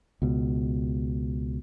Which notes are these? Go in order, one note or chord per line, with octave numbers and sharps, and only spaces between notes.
C#2 B2